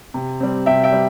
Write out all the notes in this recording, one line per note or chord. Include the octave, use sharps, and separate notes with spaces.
C3
G3 C4
C3 E5 G5
E5 G5
G3